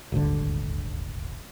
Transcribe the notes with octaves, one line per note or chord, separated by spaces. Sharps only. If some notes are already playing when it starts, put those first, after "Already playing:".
D#1 G#1 D2 D3